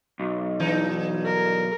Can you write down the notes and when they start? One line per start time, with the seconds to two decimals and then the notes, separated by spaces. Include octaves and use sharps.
0.20 B1
0.59 G2 E3 D#4
1.24 A#4